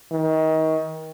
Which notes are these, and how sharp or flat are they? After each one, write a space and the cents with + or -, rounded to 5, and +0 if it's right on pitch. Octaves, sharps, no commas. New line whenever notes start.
D#3 +30